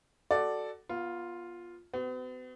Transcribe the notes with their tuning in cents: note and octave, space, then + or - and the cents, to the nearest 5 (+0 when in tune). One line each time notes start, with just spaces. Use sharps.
F#4 +15 A4 +0 D5 +5
B3 -25 F4 +0
B3 +45 F#4 +30